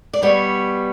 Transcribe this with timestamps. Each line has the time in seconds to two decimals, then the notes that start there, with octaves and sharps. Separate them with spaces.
0.13 D5
0.22 B2 G3 B3 C#5